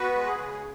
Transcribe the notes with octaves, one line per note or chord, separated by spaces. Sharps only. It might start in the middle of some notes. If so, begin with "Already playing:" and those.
Already playing: B3 F#4 B4
G#3
G#4
C#3